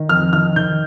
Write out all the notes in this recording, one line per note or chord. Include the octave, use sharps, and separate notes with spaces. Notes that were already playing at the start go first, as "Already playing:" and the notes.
Already playing: D#3
F2 F6
D#3 F6
D#3 G6